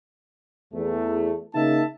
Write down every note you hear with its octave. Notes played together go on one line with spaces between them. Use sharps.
E2 A3
C#3 A#3 D#4 E5 A5